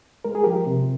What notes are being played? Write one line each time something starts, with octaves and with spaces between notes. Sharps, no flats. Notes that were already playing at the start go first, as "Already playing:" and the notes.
G#3 A#4
G#4
F3 G4 A#4
C3